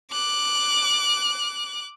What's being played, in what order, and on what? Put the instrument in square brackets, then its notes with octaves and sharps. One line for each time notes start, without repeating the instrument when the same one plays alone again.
[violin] D6 F#6